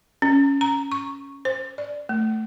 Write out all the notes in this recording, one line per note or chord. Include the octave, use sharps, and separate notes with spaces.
C#4
A#5
C#6
C5
D5
A3